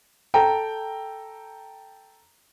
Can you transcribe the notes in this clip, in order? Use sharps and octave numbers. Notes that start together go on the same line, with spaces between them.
A4 G5 A#5